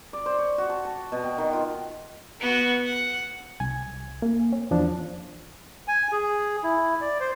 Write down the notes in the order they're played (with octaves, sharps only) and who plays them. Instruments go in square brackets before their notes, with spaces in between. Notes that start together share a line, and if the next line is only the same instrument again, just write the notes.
[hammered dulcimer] D5
C5
C#5
F#4
A5
A5
B2
G5
D#3
F4
[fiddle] B3 F#4
F#5
[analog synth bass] C2 [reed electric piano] G#5
[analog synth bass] A#3
C#4
[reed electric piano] E2 F3 D4
[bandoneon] G#5
G#4
E4
D5
C5